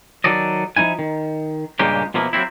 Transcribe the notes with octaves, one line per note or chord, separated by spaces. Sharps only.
D#3 F#3 A4 D5 D#5
F3 A#3 D#4 E4 G#5
D#3
G2 A#2 C#3 G#3 A#3 G4
B2 F3 A#3 E4
F#3 A#3 C4 E4